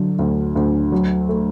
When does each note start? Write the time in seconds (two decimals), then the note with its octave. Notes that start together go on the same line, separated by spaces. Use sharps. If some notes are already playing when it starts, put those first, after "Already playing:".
Already playing: D3 F#3
0.19 D2
0.56 D2
0.92 F#3
1.29 A3